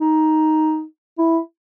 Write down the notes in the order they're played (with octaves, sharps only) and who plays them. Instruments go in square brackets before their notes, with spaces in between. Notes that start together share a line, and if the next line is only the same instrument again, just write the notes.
[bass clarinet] D#4
E4